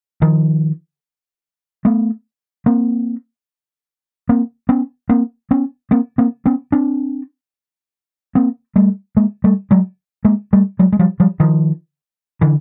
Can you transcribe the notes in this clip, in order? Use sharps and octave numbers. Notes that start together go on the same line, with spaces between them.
D#3 F3
A3 B3
A#3 C4
A#3 C4
B3 C#4
A#3 C4
B3 C#4
A#3 C4
A#3 C4
B3 C#4
C4 D4
A#3 C4
G3 A3
G#3 A#3
G3 A3
F#3 G#3
G#3 A#3
G3 A3
F#3 G#3
G#3
F3 G3
F3 G3
D#3 F3
D3 E3